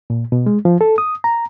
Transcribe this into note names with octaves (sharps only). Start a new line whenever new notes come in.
A#2
B2
G#3
F3
A4
D#6
A#5